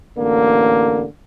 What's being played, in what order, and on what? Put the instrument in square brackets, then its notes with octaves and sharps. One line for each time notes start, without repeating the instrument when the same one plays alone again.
[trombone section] A1 D3 A#3